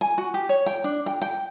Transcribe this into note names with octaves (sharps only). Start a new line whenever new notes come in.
G#5
F#4
G4
C#5
G5
D4
G5
G5